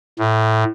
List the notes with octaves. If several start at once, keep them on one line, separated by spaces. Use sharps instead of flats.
A2